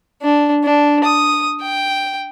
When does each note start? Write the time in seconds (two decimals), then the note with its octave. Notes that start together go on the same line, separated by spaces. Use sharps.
0.22 D4
0.64 D4
1.04 D#6
1.61 G5